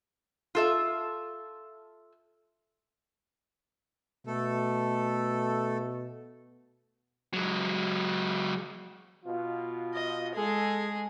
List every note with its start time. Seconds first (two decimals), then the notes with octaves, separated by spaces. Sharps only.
0.55 F4 A4 E5
4.27 B2 A3 A4
7.34 F#3 G#3
9.25 B2 F4
9.94 D#5
10.35 G#3 G#4 A4